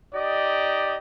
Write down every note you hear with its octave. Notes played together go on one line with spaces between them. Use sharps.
D#4 G4 D5 D#5